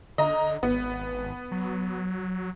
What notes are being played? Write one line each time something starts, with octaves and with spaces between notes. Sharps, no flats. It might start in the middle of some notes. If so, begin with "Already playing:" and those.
D3 D#5 A#5
G#1 B3
F#3